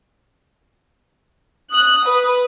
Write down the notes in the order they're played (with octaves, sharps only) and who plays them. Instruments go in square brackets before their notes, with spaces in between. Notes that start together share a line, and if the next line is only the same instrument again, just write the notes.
[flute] D#6 [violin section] F#6
[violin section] B4